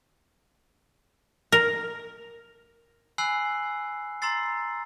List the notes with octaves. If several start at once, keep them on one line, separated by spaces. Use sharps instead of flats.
A#4
G#5 B5 E6 F#6 C7 F#7
A#5 C6 E6 A6 C7